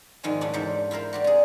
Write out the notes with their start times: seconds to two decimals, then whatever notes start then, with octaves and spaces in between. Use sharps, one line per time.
0.23 F2 G#2 D#3 G#3 G#5
0.41 C#3 A3 D4 E4 D5
0.53 E2 G#2 G4 A4 A#4 C5
0.91 E4 F4 A#4 C5
1.13 F#4 G4 D5
1.24 C3 G#4